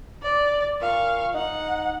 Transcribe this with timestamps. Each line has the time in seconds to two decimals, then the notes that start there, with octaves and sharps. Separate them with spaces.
0.23 D5
0.81 A#2 F5 C#6
1.34 D#4 F#5